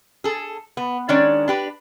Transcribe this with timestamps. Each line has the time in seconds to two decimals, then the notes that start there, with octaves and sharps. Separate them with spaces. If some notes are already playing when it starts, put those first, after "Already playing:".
0.24 G#4 A4
0.77 B3
1.09 D#3 G#3 C#4 D4 D5
1.48 D4 G4 B4